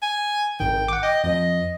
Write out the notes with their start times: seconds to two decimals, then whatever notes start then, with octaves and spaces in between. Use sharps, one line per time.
0.03 G#5
0.60 G#1 D#3 G5
0.88 F#5 D6
1.03 D#5 G5
1.24 F2 F3 D#5